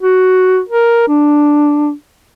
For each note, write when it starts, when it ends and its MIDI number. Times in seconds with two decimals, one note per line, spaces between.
0.03 0.60 66
0.69 1.05 70
1.08 1.92 62